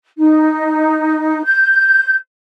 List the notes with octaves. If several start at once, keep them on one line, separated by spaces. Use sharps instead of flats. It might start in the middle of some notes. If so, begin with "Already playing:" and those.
D#4
G6